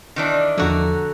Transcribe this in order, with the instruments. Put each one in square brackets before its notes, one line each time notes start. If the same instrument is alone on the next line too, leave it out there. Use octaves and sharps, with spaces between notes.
[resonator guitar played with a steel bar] D#3 E3 D4
[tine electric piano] E2 F3 [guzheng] D3 F#4 A#5